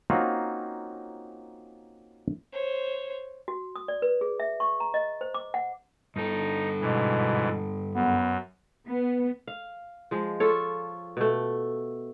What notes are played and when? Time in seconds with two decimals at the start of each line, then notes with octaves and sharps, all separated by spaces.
0.10 A#3 C4 C#4 D#4 F4 F#4
2.52 C5 C#5
3.48 F#4
3.76 D#6
3.88 D5
4.02 B4
4.21 G#4
4.40 E5
4.60 C#6
4.80 A#5
4.94 D#5
5.21 C5
5.34 D6
5.54 F#5
6.16 G2 D#4 A4
6.81 G#2 B2 E3
7.95 F#2 B3
8.89 B3
9.47 F5
10.11 F3 G#3
10.40 F4 A4 C#5
11.17 B2 A3